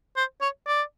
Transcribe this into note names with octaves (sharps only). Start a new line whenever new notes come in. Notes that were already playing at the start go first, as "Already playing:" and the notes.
C5
C#5
D5